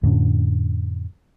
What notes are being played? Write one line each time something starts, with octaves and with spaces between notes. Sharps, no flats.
F2 A2 D3 C#4